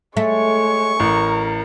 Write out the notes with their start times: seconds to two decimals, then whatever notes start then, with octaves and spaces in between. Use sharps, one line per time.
0.17 G#3 A3 C#5 C#6
1.00 A1 A#4 A#5